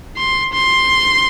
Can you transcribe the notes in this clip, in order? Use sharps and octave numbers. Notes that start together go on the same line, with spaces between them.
C6
C6